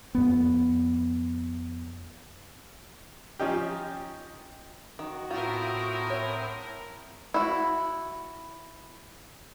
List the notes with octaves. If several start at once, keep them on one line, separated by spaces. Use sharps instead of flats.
F2 B3
F3 C#4 D#4 G4
D#3 F#4
A2 C4 E4 F4 A#4 D#6
C#5
E4 F#4